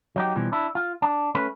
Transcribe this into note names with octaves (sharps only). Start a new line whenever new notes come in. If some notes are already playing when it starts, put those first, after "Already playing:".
F#3 D#4 G4
B2 E3 F3 G3
D4 E4
F4
D4
A3 C#4 B4